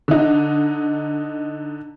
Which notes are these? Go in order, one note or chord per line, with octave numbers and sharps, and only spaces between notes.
D3 D#4